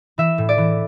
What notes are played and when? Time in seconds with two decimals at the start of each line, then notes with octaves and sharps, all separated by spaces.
0.18 E3 E5
0.38 A2
0.49 D5
0.58 E3